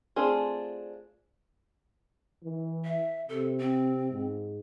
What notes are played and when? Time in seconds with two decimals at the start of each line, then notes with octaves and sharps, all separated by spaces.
0.16 A3 C4 D4 F4 G#4
2.44 E3
2.85 E5
3.29 C3 A4
3.60 C4
4.11 G#2